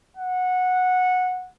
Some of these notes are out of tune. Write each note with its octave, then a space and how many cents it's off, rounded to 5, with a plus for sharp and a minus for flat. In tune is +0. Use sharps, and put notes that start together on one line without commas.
F#5 -15